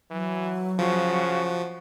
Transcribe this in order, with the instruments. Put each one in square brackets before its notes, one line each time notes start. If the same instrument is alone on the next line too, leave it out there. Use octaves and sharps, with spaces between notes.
[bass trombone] E3 [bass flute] F#3
[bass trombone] C#3 [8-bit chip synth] F3 [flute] F#4